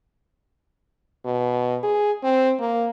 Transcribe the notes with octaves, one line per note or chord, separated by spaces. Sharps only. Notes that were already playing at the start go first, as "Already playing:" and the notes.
B2
G#4
C4
A#3